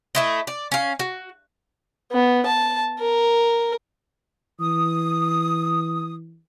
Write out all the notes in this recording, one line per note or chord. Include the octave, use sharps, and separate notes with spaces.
A3 E4 D#5
D5
C#4 F5
F#4
B3
A5
A#4
E3 D#6